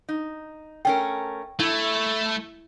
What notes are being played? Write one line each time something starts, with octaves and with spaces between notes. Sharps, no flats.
D#4
A3 C#4 A#4 G5
A3 E4